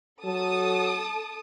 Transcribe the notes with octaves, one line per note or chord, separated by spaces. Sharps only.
F#3 A4 A5 D#6